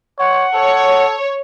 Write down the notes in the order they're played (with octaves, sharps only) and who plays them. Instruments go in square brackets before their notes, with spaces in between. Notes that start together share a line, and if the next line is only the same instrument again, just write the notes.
[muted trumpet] C#5 [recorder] F#5
[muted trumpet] A4 [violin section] C#5